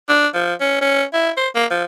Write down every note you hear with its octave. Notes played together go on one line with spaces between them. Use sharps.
D4
F3
C#4
C#4
E4
C5
A#3
F3